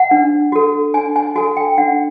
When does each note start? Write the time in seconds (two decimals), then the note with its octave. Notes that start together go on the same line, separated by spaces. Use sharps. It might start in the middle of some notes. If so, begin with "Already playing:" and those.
Already playing: F#5
0.11 D4
0.52 F#4 A4
0.94 D4 G#5
1.16 G#5
1.35 F#4 A4 G#5
1.57 G5
1.78 D4 F#5